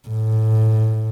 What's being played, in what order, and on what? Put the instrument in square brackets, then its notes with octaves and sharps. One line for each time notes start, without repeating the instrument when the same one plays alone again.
[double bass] A2